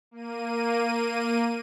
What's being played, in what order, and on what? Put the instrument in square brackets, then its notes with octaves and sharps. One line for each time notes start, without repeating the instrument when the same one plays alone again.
[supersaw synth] A#3 D#7